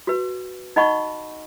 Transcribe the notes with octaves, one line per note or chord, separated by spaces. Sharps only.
F#4 B4
D#4 D#5 F#5 B5 C#6